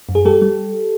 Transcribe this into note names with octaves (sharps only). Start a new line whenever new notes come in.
F#2
G#4
G3 G4 A4
G3